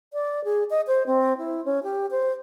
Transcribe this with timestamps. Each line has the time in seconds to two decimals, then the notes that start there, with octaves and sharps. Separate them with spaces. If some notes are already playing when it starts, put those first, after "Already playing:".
0.13 D5
0.44 G#4
0.70 D#5
0.87 C5
1.07 C4
1.38 E4
1.65 C#4
1.83 G4
2.11 C5